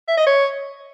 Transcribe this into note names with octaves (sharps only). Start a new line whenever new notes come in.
E5
D#5
C#5